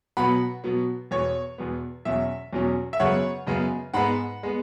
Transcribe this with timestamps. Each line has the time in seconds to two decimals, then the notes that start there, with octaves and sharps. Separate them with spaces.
0.17 B2 F#3 B3 F#5 B5
0.64 B2 F#3 B3
1.11 E2 B2 B3 C#5
1.58 E2 B2 B3
2.05 E2 B2 F#3 C#4 E5
2.53 E2 B2 F#3 C#4
2.93 E5
3.00 F#2 C#3 G#3 B3 C#5 F#5
3.47 F#2 C#3 G#3 B3
3.94 G#2 G#3 B3 F#5 B5
4.43 G#3 B3